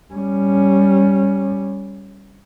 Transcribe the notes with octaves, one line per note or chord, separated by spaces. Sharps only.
G3 C#4